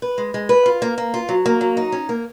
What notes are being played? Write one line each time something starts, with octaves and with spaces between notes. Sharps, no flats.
B4
G#3
G#3
B4
F4
A#3
A#3
F4
F#3
A#3
F#3
D#4
C#4
A#3